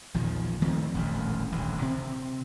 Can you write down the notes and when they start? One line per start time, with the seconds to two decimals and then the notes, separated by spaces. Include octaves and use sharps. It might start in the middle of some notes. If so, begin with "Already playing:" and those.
0.14 A#1 E2 D#3 F3
0.62 D#3 F3 A3 C4
0.94 D#1 A1 F2
1.52 D#1 A1 D2
1.82 C3 C4